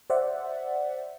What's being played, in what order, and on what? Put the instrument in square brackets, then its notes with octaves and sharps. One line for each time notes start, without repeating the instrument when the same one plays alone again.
[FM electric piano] C5 D5 E5 F#5